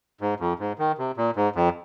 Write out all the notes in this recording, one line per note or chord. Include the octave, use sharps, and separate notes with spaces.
G#2
F2
G#2
D#3
C3
A#2
G#2
F2